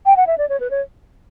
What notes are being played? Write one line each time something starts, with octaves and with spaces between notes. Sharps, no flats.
G5
F#5
E5
D5
C#5
B4
C#5